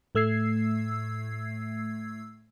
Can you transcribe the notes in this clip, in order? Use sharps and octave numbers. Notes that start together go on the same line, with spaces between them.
A2 A3 E6 G#6 C7